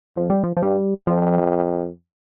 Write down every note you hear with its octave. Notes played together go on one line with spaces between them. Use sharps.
F2 F3
G3
F3
F3
G2 G3
F2 F3